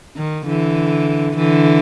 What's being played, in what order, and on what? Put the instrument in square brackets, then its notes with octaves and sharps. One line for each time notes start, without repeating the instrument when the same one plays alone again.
[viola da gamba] D#3
D3 E3
D3 E3